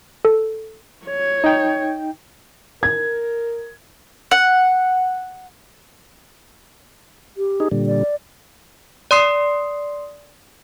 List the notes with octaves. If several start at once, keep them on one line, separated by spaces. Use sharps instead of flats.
A4
C#5
D#4 G5
A#4 G#6
F#5
G4
D#4 G#4
A#2 D3 G3
D5
D5 C6 D#6 C7